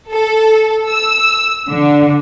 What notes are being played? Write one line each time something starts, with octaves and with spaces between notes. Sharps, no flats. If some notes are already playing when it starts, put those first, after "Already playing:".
A4
E6
D3